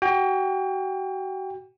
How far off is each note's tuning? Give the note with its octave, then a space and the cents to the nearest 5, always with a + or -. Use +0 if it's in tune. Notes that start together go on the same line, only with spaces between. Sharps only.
F#4 +35 G5 +30